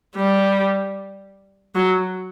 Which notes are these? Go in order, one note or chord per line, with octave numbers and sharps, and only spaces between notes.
G3
F#3